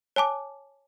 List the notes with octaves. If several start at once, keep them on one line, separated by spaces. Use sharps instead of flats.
C#5 G#5 A5 D6